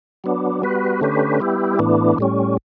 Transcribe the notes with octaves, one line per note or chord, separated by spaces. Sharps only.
F#3 B3 D4
G3 B3 F#4 B4
D3 A3 C#4 G4 B4
G3 B3 E4 G4
A2 E3 B3 D4
A2 G3 C#4